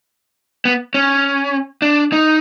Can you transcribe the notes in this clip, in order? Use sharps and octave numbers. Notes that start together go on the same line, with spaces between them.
B3
C#4
D4
D#4